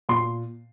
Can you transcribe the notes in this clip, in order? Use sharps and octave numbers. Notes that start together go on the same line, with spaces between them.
A#2 C6